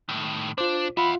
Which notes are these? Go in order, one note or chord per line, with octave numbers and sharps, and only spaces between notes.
A2 D#3
D4 F4 C5
F4 E5 F#5 B5